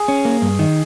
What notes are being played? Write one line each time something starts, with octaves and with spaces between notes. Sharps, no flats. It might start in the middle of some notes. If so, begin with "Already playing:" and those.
Already playing: G#4
C#4
A#3
G2
D#3